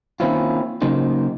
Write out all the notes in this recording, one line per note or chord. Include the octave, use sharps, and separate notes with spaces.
D#3 A#3 C4 C#4 E4 F4
C#3 F#3 A#3 D#4 C5